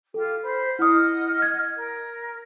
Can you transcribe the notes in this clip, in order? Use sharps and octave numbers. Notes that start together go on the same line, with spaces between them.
F4 G4 A4
C5 B5
E4 D#5 F#5 D#6 F6
G#6
A#4